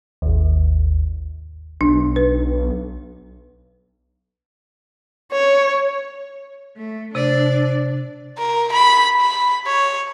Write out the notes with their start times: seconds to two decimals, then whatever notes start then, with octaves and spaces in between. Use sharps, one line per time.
0.22 G#1 D#2
1.81 B1 D4
2.16 B4
5.32 C#5
6.77 A3
7.15 C3 D4 D5
8.38 A#4
8.72 B5
9.21 B5
9.67 C#5